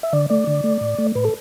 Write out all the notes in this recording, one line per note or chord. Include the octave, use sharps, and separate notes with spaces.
E5
D3 D5
A3 D5
D3
A3
A2
A3
A2 B4
A4